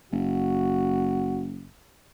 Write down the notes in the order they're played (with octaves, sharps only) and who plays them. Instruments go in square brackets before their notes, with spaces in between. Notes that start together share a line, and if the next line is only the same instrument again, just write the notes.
[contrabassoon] F#1 [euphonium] F#4